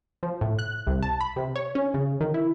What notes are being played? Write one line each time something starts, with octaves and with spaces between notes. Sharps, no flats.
F3
A2
F#6
C2
A5
B5
C3
C#5
C#4
C#3
D#3
E4